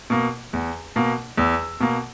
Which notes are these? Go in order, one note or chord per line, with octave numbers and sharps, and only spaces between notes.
B2 A#3
E2
B2 A#3
E2 E6
B2 A#3